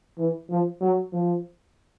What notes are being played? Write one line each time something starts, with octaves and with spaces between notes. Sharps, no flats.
E3
F3
F#3
F3